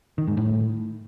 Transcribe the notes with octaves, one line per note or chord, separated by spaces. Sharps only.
D#3
G#2
A2